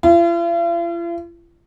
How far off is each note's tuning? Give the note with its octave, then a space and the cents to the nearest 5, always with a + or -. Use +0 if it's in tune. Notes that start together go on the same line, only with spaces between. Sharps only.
F4 -45